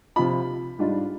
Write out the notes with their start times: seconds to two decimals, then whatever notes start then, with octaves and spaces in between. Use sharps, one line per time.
0.16 C3 F3 C4 F4 B5
0.79 G#2 G3 D4 F4